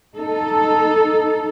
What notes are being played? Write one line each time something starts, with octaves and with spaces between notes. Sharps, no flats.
D#4 A4